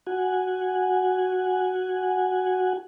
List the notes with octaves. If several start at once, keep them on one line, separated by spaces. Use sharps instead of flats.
F#4 F#5 G#5